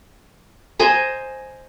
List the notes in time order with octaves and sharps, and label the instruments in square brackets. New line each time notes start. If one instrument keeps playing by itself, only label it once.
[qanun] C5 D#5 G#5 A#5